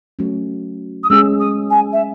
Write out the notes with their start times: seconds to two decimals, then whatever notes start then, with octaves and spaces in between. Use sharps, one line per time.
0.19 F#3 A3 C#4
1.03 D#6
1.10 G#3 C#4 G#4 E6
1.40 D#6
1.70 G#5
1.93 E5